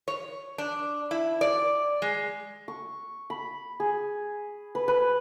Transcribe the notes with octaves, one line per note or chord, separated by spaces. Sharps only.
C#5
D4
E4
D5
G#3
C#6
B5
G#4
B4
B4